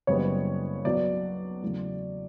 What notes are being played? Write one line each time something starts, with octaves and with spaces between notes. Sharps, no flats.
F#1 F#2 C#3 G3 B3 C#5
B1 B2 F#3 B3 D5
E2 C#3 F#3 A3